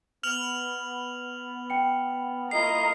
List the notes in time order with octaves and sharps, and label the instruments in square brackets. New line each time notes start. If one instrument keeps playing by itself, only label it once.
[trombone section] B3 [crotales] F6 F7 F#7
[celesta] G5 C#7
[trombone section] A#3 E4 F4 [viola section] A#4 D#5 A#5 [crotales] C7